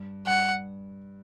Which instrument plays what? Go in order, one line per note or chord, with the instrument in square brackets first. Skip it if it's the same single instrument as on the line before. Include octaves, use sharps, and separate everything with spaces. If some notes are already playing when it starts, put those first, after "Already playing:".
Already playing: [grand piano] G2
[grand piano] G2 [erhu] F#5